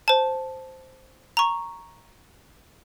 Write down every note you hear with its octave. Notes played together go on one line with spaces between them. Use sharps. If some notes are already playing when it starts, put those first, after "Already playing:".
C5 A5
A#5 C#6